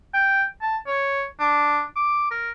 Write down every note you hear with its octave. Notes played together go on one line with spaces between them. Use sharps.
G5
A5
C#5
D4
D6
A#4